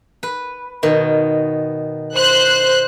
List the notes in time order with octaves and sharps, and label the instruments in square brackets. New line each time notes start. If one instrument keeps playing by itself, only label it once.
[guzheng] B4
B2 D#3
[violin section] C5 F#6